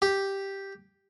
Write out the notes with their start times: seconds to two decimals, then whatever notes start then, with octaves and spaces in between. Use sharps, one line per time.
0.02 G4